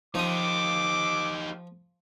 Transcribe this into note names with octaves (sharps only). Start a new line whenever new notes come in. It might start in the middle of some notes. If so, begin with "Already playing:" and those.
F3 D#4 G4 D6 D#6